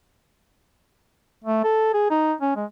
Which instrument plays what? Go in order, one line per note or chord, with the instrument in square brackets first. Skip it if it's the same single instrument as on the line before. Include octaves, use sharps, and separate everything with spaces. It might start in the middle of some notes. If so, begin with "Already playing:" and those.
[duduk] A3
A4
G#4
D#4
C#4
G#3